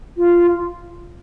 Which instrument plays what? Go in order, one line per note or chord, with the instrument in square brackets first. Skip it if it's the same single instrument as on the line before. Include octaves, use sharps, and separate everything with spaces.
[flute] F4